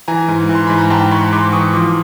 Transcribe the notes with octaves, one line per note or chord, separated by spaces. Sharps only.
E3 G#5 A#5
G#2
E3
C6
G#2 B5
A#5
G#2 G5 A5
G#2 B5 C#6
G#2 C6 D6
E3 C#6 D#6
F3 C6 D6